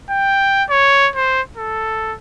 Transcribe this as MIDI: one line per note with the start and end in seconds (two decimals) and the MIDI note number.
0.10 0.64 79
0.70 1.09 73
1.16 1.41 72
1.57 2.15 69